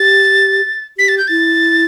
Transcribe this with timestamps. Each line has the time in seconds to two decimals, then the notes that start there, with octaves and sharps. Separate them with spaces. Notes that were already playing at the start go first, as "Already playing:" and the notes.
Already playing: G4 A6
0.98 G4 B6
1.08 A6
1.18 G6
1.28 E4 A6